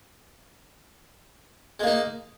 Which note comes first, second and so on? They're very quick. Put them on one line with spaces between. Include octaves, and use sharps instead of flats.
G#3 A#3 D#4